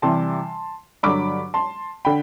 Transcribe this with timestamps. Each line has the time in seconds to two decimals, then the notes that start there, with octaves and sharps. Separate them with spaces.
0.02 C3 E3 G3 A5 C6
1.03 G2 D3 F#3 B5 D6
1.54 A5 C6
2.05 D3 G5 B5